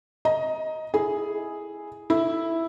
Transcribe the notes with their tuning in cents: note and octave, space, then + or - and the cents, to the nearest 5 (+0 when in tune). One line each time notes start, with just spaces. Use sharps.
D#5 +15 A#5 +0
E4 +0 G#4 +0
E4 +0 A4 +0